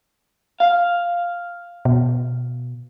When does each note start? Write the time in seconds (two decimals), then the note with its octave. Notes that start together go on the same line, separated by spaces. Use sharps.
0.60 F5
1.85 B2